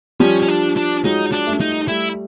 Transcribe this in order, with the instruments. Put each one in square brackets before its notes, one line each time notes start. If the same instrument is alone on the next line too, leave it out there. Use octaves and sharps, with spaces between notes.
[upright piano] F3 G3 [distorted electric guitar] C#4
[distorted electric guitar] C#4
D4
D4
[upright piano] F#3 G#3 [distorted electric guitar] D#4
[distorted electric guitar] D4
[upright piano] G3 A3
[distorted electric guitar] D#4
[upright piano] G3 A3 [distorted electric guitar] E4